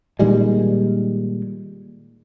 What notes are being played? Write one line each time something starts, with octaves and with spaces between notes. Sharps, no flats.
A#2 D#3 G3 G#3